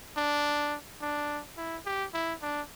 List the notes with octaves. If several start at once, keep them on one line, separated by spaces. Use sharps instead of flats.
D4
D4
E4
G4
E4
D4